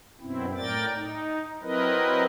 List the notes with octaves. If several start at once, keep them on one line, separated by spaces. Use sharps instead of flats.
F#2 B2 C4 E4
A2 A#4 D5 G5 A6
D#4
F#3 C4 E4 A#4 B4 D#5